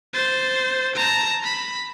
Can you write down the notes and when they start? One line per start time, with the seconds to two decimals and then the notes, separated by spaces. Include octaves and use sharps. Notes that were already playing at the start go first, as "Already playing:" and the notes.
0.13 C5 A6
0.95 A5 A#5
1.44 B5